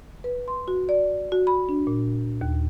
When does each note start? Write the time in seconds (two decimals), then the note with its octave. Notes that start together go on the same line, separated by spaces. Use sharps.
0.24 B4
0.48 C6
0.68 F#4
0.89 D5
1.32 F#4
1.47 B5
1.69 D4
1.87 A#2
2.41 D#2